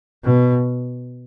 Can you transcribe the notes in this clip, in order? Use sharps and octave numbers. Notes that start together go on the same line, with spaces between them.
B2